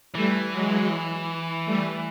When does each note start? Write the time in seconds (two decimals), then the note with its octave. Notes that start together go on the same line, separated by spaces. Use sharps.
0.14 E3 G3 A3
0.52 F#3 G#3
1.65 G3 A3